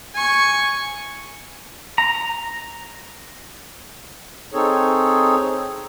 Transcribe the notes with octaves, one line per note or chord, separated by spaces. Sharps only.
G#5 C#6
A#5
C4 D#4 G#4 A4 C#5